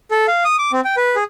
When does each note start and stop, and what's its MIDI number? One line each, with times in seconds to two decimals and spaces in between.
0.11 0.26 69
0.28 0.44 77
0.45 0.56 87
0.59 0.72 86
0.73 0.81 60
0.84 0.96 79
0.97 1.16 71
1.16 1.24 68